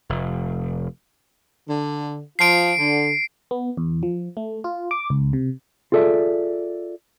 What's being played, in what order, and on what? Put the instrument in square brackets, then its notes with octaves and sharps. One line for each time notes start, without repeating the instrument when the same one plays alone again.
[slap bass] F1
[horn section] D3
[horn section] F3 F4 [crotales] C7 D7
[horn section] D3
[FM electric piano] B3
E2
F3
A3
F4
D6
C#2
C3
[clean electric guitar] F4 G#4 A4 D5 E5